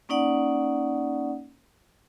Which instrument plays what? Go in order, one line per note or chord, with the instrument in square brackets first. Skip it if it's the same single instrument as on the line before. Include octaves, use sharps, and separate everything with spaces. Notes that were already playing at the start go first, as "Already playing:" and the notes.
[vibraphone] A#3 C#4 D#4 D5 F#5